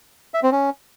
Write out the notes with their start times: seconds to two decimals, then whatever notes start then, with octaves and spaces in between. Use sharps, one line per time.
0.34 E5
0.43 C4
0.52 C#4